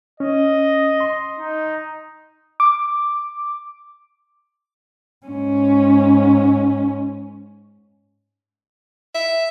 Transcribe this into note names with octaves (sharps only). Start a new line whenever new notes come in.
C#4 D#5
C6
D#4
D6
G#2 C#4
E5